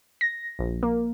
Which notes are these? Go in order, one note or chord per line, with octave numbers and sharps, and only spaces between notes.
A#6
A#1
A#3